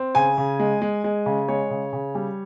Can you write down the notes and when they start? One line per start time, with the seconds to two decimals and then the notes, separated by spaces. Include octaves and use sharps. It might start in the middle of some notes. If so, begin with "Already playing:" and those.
Already playing: C4
0.15 C#3 G#5
0.37 C#3
0.59 G#3
0.82 G#3
1.04 G#3
1.26 C#3
1.48 G#3 C#5
1.71 C#3
1.93 C#3
2.15 G3